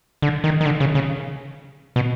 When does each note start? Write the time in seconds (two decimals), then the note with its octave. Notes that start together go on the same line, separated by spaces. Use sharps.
0.22 D3
0.44 D#3
0.61 D#3
0.66 D3
0.80 C#3
0.95 C#3
1.96 B2